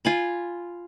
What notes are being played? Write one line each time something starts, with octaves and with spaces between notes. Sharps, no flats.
F4 G#5 B5